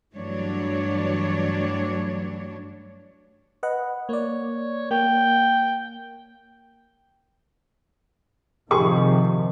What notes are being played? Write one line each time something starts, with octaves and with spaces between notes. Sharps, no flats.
G2 E3 F#3 A3 D4 C#5
B4 D#5 F#5
A#3 C#5 D5
A#3 G5
C3 D#3 F3 G4 G#4 C#6